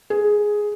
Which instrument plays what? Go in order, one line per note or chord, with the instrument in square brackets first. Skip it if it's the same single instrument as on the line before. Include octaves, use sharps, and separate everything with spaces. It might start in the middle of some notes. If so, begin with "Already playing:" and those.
[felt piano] G#4